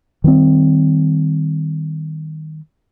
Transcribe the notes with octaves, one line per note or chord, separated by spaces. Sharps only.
D#3 G3 A#3 C4